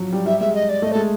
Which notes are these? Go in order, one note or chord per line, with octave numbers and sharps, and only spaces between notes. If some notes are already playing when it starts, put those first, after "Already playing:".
Already playing: F3 F#3
G3
G3 E5
G#3 E5
D#5
D5
A3 D#5
G#3 A4